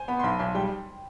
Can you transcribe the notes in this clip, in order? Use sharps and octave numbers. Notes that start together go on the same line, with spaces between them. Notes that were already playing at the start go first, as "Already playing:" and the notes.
Already playing: C5 G#5
B3 B5
C6
B1 B5
B1 G#5
G3 G5